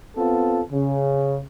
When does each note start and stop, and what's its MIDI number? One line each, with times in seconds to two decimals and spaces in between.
0.17 0.62 59
0.17 0.62 60
0.17 0.62 65
0.17 0.62 69
0.72 1.41 49